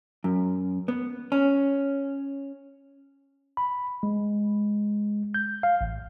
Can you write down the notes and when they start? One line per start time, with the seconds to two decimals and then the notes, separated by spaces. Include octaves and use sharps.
0.24 F#2
0.88 B3
1.32 C#4
3.57 B5
4.03 G#3
5.34 G6
5.63 F5
5.81 A1